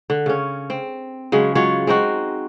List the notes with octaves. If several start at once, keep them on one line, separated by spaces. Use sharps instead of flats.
D3
C#3 C#4
C4
C#3 F#3 G#3
F#3 G#3 F4 C#5
G#3 C4 D#4 F#4